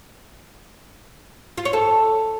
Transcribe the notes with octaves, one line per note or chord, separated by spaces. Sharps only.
F4
C#5
A4